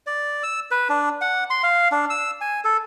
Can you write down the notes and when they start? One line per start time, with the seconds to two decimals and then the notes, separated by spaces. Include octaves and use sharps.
0.07 D5
0.43 E6
0.71 B4
0.89 D4
1.21 F#5
1.50 C6
1.63 F5
1.92 D4
2.10 E6
2.41 G#5
2.64 A4